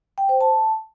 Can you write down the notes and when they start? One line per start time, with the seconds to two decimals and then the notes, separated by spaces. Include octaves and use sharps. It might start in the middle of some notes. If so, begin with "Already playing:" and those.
0.18 G5
0.29 C5
0.41 A5